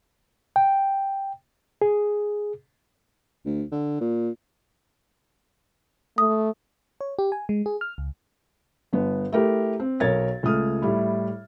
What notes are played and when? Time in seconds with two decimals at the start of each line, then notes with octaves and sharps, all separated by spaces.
0.56 G5
1.82 G#4
3.45 D2
3.72 D3
4.01 A#2
6.18 A3 D#6
7.01 C#5
7.19 G4
7.32 G#5
7.49 G#3
7.66 G#4
7.81 F6
7.98 C#2
8.93 G1 B3
9.33 A3 E4 G4 A#4
9.80 C4
10.00 B1 A#4 C#5 G#6 A6
10.43 C#2 A3 D#6 F6
10.82 A2 G3 E4